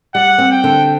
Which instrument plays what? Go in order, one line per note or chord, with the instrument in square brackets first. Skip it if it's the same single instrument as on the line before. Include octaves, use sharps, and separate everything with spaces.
[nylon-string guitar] G3 [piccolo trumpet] F#5
[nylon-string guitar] C4
[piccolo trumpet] G5
[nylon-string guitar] D3